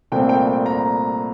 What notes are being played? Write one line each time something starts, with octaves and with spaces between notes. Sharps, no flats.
C2 A#2 A3 C4 G5
G5
A#5